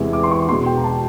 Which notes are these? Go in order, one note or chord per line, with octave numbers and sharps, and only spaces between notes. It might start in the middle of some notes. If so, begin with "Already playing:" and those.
Already playing: E2 C3 E3 G#3
D6
C6
C#6
E2 B2 G#3 C6
G5
A#5
A5